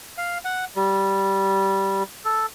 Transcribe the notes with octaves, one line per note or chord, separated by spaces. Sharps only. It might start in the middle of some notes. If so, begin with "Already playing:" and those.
F5
F#5
G3
A4